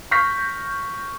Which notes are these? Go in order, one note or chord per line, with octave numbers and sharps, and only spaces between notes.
C#6 F6 G6 A#6 B6